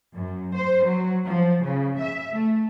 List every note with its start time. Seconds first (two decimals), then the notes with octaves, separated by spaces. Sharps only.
0.14 F#2
0.55 C5
0.85 F#3
1.26 F3
1.64 C#3
2.00 E5
2.34 A3